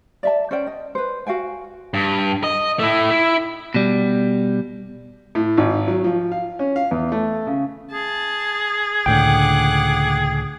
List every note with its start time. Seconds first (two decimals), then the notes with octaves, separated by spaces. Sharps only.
0.23 D5 E5 A5
0.51 C#4 C5 D5 G5
0.67 D#5
0.95 B4 C5
1.27 F#4 F5 G5 G#5
1.94 G2
2.44 D#5
2.79 A3 E4
3.10 E4
3.74 B2 G3
5.35 A2
5.57 G#1
5.88 F#3
6.04 F3
6.32 F5
6.59 C#4
6.76 F5
6.91 E2
7.12 A3
7.47 C#3
7.92 G#4 A5
9.06 C#2 A2 D3 F#5 G5 D6